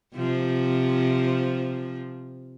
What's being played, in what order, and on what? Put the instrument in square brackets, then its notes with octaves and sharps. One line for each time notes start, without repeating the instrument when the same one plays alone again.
[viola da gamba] C3 F3